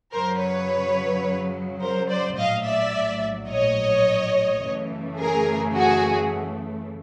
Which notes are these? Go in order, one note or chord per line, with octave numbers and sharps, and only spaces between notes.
F#2 C#3 F#3 A#4 C5
B4 C#5
A#4 C5
C5 D5
A#1 A2 F#3 D#5 F5
D5 E5
C#5 D#5
F#2 C#3 E3 A3
G#4 A#4
F#4 G#4